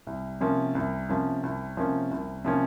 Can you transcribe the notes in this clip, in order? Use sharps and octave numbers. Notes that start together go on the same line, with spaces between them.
C2
C3 F3 A#3 C#4
C2
C3 F3 A#3 C#4
C2
C3 F3 A#3 C#4
C2
C3 F3 A#3 C#4